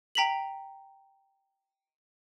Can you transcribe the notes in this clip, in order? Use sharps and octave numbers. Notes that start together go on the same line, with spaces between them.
G5 A#5 B6 F7 F#7